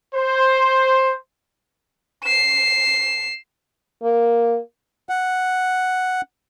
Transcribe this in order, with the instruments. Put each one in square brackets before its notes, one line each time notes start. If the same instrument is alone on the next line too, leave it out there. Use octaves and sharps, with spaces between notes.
[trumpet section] C5
[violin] C7 E7
[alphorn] A#3
[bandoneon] F#5